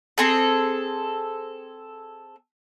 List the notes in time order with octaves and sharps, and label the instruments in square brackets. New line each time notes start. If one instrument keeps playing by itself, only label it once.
[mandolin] C4 G#4 A4